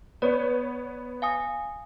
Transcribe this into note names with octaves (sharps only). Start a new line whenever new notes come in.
B3 B4 C#5 D5
F5 G#5 D#6